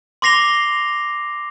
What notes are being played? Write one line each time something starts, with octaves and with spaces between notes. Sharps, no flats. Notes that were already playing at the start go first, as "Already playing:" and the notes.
C6 D6 A#6 C7 F7 G7